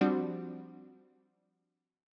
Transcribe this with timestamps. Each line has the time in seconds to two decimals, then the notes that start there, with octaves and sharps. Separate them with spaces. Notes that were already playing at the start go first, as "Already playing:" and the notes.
0.01 F3 G3 C4 D4 F#4